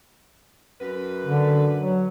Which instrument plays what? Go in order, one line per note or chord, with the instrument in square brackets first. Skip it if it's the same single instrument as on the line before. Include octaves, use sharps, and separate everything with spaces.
[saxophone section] F#2 B4
[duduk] D3
F#3